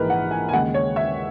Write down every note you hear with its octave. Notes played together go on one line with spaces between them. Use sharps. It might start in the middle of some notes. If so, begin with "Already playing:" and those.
Already playing: A#1 G#2 E3 G#3 A#4 B4
F#5
G#5
G#5
D#2 C#3 G#3 F#5
C#5
E5